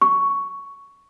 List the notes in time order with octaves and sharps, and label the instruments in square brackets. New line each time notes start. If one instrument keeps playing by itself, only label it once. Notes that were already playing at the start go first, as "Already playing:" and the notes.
[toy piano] C#6